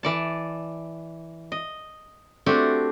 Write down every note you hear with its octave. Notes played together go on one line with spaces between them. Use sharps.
E3 D5 A5
D#5
A3 C4 D4 F#4 G4